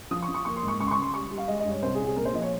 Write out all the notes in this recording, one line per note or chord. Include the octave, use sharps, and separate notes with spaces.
F3 D#6
C#6
F3
C#6
A#3 C#6
C6
G#2
C#6
C#2 C#6
C6
C#6
C#2
C6
G3 C#6
G3
F5
G#3 D#5
D#5
G2
C#5
C2 C5
G#4
C2
G#4
A#2 A#4
C5
F3 D#5
C#5